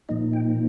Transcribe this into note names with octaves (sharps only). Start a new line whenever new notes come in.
A#2 F3 A#3 D#4 D#5
G5